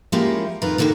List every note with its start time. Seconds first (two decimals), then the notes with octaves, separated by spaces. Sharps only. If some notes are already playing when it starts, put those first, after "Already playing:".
0.12 F3 G#3 A#3 C#4 E4 G4
0.62 F2 D#3 F4 B4 A#5
0.78 D3 D#3 A#3 F#4 G4